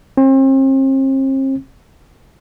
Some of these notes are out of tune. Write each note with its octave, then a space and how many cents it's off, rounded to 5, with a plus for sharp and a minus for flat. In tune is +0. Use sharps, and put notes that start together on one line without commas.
C4 +40